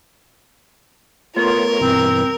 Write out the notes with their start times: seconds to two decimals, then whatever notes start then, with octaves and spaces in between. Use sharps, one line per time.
1.36 A3 B3 F4 A#4 C#5
1.81 G2 B2 E3 C4